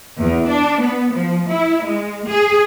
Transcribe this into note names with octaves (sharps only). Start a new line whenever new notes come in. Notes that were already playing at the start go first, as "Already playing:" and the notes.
E2
D4
B3
F3
E4
G#3
G#4